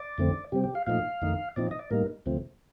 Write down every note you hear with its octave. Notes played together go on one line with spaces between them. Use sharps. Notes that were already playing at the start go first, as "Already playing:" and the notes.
Already playing: D5
F2 D3 A3 C4
C3 G3 C4 G4
G4
F5
A#2 F3 A3 D#4 F5
F2 D#3 A3 D#4
A#2 F3 C4 D#4 D5
D#5
D5
A2 G3 A#3 D#4 A#4
D2 C3 F3 A3 C4